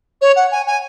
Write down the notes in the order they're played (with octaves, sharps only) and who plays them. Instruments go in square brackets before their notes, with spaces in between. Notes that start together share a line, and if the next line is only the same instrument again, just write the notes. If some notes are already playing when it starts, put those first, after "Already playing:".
[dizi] C#5
F#5
G#5
G#5